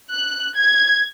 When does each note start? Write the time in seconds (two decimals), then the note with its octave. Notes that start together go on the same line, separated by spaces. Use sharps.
0.11 F#6
0.57 G#6